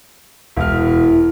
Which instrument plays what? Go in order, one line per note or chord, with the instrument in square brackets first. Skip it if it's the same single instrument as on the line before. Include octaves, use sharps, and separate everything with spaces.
[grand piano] E1 F6 [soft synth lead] E4